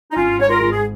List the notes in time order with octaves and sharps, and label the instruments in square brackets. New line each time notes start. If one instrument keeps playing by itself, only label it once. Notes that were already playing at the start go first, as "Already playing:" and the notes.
[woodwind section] D#4
[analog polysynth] G#1 [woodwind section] C#4 F4
[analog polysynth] G#2 [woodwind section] C#5
[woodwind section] F4 A#4
[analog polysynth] G#1 [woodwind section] F4
[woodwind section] G#4